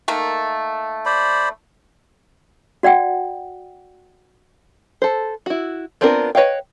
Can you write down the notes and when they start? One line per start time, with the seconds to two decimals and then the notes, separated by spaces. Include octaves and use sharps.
0.08 D#3 A3 A#3
1.06 C5 D5 B5
2.83 F#4 D5 F#5 G5
5.02 A4 C5
5.46 E4 F#4
6.01 B3 C4 D4 F4 A#4
6.35 B4 C#5 D#5 F5 G5